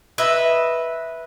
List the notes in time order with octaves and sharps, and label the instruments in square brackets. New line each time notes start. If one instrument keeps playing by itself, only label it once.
[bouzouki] B4 D#5 E5